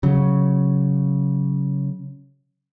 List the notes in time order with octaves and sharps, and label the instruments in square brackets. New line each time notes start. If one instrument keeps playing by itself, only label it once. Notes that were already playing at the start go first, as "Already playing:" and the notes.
[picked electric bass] C#3 F#3